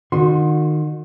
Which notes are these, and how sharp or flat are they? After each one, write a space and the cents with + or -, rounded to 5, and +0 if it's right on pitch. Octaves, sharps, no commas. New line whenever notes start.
D#3 -25 F#4 -25 C6 +20